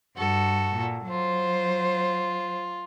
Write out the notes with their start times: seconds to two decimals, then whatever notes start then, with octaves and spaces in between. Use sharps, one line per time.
0.17 G2 F#4 A4
0.75 A#2
1.09 F#3 F4 C5